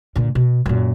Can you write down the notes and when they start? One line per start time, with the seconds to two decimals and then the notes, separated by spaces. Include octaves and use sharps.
0.15 A#2 D3
0.35 B2
0.66 F#2 A#2